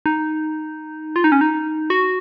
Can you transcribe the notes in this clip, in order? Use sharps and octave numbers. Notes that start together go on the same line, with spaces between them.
D#4
F4
D#4
C#4
D#4
F#4